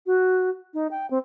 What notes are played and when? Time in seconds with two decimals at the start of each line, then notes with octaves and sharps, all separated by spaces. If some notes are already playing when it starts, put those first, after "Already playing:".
0.06 F#4
0.74 D#4
0.91 G5
1.10 C4